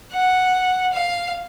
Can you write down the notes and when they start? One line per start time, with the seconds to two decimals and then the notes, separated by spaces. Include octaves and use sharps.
0.13 F#5
0.93 F5